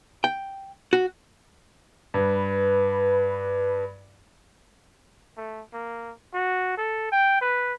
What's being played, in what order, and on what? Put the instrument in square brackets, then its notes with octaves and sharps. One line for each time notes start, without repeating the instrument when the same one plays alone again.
[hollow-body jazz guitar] G5
F#4
[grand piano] G2 [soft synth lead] B4
[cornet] A3
A#3
F#4
A4
G5
B4